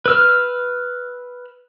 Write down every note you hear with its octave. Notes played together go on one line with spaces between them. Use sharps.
B4 E6 F6